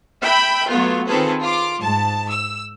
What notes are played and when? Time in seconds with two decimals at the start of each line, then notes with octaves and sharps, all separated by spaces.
0.24 E5 G5 B5
0.68 F#3 A3 B3 F4
1.07 D#3 C4 F4 G#4 A4 B4
1.41 F4 D6
1.80 G#2 A5
2.29 E6